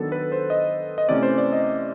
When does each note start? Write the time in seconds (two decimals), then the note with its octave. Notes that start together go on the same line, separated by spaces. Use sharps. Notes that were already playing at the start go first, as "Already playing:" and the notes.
Already playing: D#3 F#3 B3 D4 A4
0.12 B4
0.32 C5
0.50 D#5
0.98 D#5
1.09 C3 E3 A3 C#4 D5
1.23 C5
1.38 D5
1.52 D#5